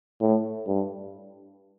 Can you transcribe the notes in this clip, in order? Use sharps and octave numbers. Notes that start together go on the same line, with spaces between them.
A2
G2